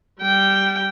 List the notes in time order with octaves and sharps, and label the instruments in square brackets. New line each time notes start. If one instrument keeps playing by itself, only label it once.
[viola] G3 G5